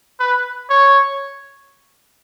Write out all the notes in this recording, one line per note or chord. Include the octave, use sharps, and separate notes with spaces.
B4
C#5